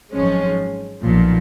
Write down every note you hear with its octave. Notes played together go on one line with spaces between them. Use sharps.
G#1 F#2 F3 G#3 C#4
B1 A#2 F3